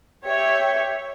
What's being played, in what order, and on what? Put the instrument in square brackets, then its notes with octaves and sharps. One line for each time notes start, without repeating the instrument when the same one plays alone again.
[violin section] G4 C#5 E5 G5